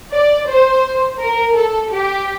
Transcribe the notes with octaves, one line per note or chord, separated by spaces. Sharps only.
D5
C5
A#4
A4
G4